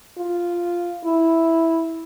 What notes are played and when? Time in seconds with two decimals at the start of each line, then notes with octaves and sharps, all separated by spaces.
0.18 F4
1.05 E4